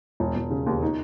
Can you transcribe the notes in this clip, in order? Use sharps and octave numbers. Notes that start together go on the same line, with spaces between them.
E1
E1
C#3
D#2
D#4